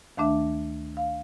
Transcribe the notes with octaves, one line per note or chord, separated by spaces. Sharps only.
D2 D#3 A3 D4 E5
F5